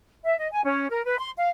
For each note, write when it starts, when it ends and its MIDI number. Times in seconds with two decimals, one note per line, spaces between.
0.24 0.36 76
0.38 0.48 75
0.51 0.61 80
0.65 0.88 61
0.89 1.04 70
1.05 1.18 71
1.19 1.30 84
1.37 1.49 77